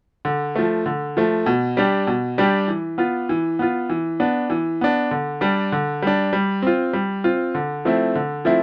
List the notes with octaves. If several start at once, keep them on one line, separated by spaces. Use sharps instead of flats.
D3
F3 A3
D3
F3 A3
B2
G3 D4 G4
B2
G3 D4 G4
E3
B3 F4
E3
B3 F4
E3
B3 D4
E3
B3 D4
D3
G3 D4
D3
G3 D4
G3
C4 F4
G3
C4 F4
D3
F3 A3 C4 E4
D3
F3 A3 C4 E4